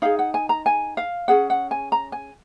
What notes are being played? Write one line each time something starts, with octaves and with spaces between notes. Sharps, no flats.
D#4 G#4 F5
F#5
G#5
A#5
G#5
F5
C#4 G#4 F#5
F#5
G#5
A#5
G#5